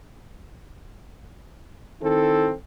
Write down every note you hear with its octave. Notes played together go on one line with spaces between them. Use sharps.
D#3 C4 E4 A4